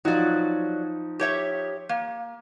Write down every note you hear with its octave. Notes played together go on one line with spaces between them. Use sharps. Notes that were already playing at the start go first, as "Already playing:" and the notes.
F3 F#3 D#4 D5
G4 C#5 E5
A#3